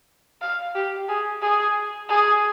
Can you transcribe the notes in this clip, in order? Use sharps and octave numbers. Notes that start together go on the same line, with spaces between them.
F5
G4
G#4
G#4
G#4